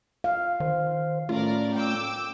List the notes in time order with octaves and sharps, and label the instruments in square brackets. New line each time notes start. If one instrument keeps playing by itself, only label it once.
[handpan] F5
[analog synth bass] D#3 [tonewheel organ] C5
[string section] A2 A#4 D5 [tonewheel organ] A3 C#4 [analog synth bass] F4
[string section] G5 D6 E6